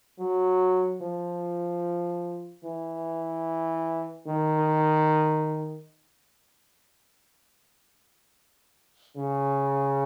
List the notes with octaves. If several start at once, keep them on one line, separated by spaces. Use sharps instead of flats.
F#3
F3
E3
D#3
C#3